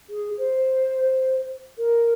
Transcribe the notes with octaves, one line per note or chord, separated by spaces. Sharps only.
G#4
C5
A#4